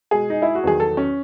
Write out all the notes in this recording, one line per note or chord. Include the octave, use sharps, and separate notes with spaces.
B2 G#3 G#4
D#4
E4
F#4
E2 D#3 F#3 G#4
A4
C#4